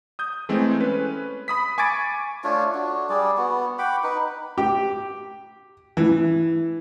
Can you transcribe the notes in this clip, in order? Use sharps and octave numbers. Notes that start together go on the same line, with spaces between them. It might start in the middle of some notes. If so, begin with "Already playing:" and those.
D#6 G6
E3 G#3 A3 C4
C#4 B4
B5 D#6 B6
G#5 C#6 D6 G#6 A6 D7
A3 D4 F4 C#5
D4 F#4
G3 G#4 D5
B3 F#4
F#5 G5 B5 D6
D#4 B4
G4
E3